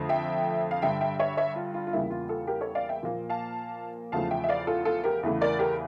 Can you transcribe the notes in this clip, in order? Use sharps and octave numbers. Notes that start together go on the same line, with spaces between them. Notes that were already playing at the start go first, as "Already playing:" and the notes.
Already playing: F2 D3 A3
E5 G5
F5
G2 D3 G3 E5 G5
E5 G5
C#5 E5
C#5 E5
F4
F4
F4
E2 C#3 G3 A#3 E4
F4
F4 A4
G4 A#4
A4 C#5
D5 F5
E5 G5
A#2 F3 A#3
F5 A5
E2 C#3 F3 A3 F5 A5
E5 G5
E5
D5 F5
F4 A4
F4 A4
G4 A#4
E2 C#3 E3 A3
A#4 D5
G4 A#4